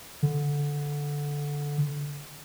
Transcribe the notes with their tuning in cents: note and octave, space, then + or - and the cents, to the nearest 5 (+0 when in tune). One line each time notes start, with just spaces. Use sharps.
D3 -10